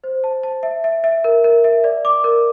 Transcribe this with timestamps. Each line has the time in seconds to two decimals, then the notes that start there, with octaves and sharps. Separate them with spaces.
0.04 C5
0.24 A5
0.43 A5
0.63 E5
0.84 E5
1.04 E5
1.24 A#4
1.44 A#4
1.64 E5
1.84 D5
2.05 D6
2.24 A#4